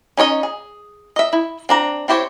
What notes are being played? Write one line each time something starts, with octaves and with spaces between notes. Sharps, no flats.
C#4 D#4 C#5 D#5
G#4
D#5 E5
E4
C4 D4 A#5
C4 E4 G4 C5 C#5